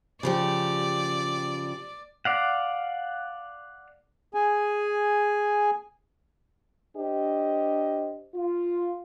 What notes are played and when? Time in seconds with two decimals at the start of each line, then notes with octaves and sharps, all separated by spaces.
0.23 C#3 F3 G4 D5
2.25 D5 F5 F#5
4.34 G#4 G#5
6.96 D4 G4 C5 D#5
8.34 F4